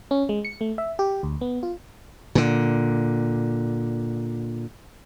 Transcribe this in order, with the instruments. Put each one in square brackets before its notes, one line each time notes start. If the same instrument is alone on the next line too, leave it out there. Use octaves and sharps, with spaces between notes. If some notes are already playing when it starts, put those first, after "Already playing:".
[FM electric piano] C#4
G#3
C#7
A3
E5
G4
D2
B3
F4
[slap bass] A#2 D3